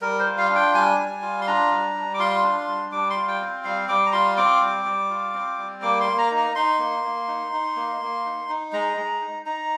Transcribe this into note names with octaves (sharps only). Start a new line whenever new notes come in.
G3 A#4
C5
F4
F5
D4
G5
G3 G#5
G3
F4
C6
D4 A#5
G3
G3
D6
F4 C6
D4
G3
G3 D6
C6
F4
G5
C4
G3 F5
G3 D6
A#5
F4 C6
C4 D6
G3
G3
F4
C4
G3
A#3 D6
C6
A#3
A#5
D#4
A#5
D#4 C6
A#3
A#3
D#4
D#4
A#3
A#3
D#4
D#4
G#3 A#5
G#3
D#4
D#4 A#5